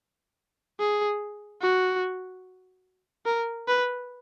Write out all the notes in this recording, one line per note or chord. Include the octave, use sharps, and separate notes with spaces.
G#4
F#4
A#4
B4